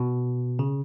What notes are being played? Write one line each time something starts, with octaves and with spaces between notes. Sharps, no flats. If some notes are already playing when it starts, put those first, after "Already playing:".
Already playing: B2
C#3